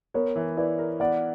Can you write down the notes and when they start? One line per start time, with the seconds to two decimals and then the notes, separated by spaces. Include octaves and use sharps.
0.14 B3 A#4 C#5
0.36 E3
0.57 E4 B4 D5
0.79 A#4
1.00 B3 D5 F#5